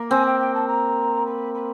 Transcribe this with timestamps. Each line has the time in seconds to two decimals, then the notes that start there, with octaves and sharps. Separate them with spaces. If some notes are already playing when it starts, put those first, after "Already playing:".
Already playing: A#3
0.10 C4 G#5
0.26 G5
0.39 G5
0.54 A5
0.67 A#5
1.26 B5
1.54 B5